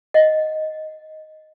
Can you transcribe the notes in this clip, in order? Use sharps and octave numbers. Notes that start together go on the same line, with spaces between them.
D#5 F#5